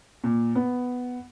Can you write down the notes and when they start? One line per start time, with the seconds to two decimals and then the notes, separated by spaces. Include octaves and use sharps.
0.24 A#2
0.55 B3